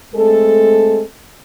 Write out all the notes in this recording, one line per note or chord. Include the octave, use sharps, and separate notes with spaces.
G#3 A3 C4 A4